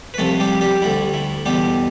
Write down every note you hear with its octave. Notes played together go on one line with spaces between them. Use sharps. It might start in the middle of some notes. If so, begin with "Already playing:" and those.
B4
C2 C3 F3 A3 A4
G3 G4
G3 G4
D2 D3 G3 E4
E4
E2 B2 G3 G4